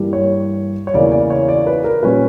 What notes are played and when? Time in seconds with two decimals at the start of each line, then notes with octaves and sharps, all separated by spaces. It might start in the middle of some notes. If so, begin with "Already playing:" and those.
Already playing: G2 E3 G3 A#3
0.13 C#5
0.87 C#5
0.94 E2 C#3 E3 A#3 D5
1.12 D5
1.30 C#5
1.48 D5
1.67 B4
1.84 A#4
2.02 A#2 G3 C#4 B4